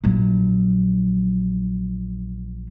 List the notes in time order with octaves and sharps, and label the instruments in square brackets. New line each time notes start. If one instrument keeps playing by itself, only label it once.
[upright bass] A#1 F#3